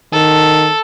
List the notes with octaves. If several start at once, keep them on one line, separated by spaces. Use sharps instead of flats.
D#3 A4